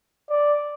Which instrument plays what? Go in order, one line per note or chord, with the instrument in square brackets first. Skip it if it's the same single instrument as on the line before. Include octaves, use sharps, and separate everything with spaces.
[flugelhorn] D5